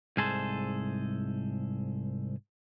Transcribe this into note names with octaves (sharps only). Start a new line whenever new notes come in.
C2 G#2 G#4 A4 C5